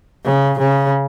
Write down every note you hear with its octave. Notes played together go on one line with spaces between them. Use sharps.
C#3
C#3